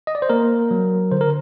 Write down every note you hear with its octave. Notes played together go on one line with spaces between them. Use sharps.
D#5
D5
C5
A#3 A#4
F#3
D3 C5
A#4